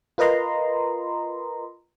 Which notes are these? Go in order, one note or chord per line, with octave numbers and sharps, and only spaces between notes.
F4 A#4 B4 D#5 A#5 C6